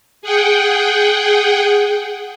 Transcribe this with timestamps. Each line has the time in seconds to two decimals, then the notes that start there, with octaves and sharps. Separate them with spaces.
0.22 G#4 F#5 G5